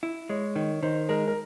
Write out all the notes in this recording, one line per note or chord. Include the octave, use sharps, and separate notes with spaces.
E4
G#3 C#5
D#3 C#5
D#3 C5
G#3 A#4
A#4